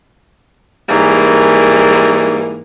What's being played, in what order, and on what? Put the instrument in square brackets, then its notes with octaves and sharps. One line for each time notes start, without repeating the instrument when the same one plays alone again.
[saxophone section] G#2 E3 G3 A#3